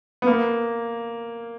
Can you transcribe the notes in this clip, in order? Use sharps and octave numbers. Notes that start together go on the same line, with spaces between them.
B3
A#3